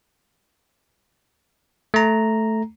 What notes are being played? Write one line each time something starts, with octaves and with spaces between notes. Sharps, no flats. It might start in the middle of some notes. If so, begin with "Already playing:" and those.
A3 A#5